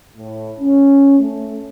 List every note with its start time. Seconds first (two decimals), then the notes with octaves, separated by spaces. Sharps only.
0.17 A2
0.60 C#4
1.19 A3